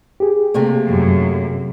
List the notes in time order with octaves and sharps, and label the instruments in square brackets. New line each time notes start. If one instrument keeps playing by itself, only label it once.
[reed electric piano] G4 G#4
[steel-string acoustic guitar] C3 A3 A#3
[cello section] F#2